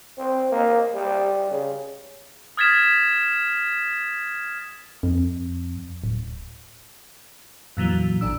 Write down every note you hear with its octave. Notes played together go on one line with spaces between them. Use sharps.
C4
A#3
G3
C#3
D#6 F6 G#6 A6 B6 E7
F2
D1
F2 A#2 E3 F#3
A1 D4 E6